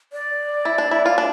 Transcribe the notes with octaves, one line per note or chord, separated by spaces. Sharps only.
D5
E4
D4
E4
F4
D4